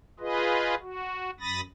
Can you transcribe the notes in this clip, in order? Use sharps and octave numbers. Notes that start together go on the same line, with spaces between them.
F4 G#4 B4 D#5
F#4
F#2 B5 D#6 A6 A#6